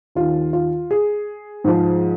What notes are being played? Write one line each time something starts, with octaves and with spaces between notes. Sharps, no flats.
D#2 D#3 F4
F4
G#4
G#2 F3